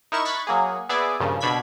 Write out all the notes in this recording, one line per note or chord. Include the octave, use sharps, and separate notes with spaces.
D#4 E4 A#4 C#6 E7
B5 C#6 F#6 G#6 A6 B6
F#3 A#3 G#4
B3 G#4 D5 E5 G#5
G2 A#2 C#3 F3
B2 D4 B5 G#6 B6